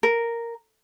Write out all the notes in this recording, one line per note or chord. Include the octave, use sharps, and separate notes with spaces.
A#4